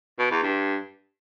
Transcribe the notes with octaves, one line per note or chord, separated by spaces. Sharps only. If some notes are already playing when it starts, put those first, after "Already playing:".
B2
E2
G2